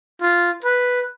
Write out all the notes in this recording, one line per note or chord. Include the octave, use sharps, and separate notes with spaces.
F4
B4